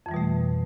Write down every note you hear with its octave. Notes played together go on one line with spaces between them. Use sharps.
F2 B2 E3 G3 A3